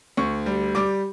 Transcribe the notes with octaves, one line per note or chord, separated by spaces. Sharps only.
D2 C#6
G3
G3 D6